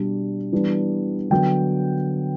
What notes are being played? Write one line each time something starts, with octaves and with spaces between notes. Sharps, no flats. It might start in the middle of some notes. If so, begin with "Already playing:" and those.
Already playing: B2 G3 D4
E3 G3 B3 D4
D3 F#3 B3 G5